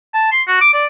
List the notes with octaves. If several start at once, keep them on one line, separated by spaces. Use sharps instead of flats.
A5
C6
F#4
D6
D5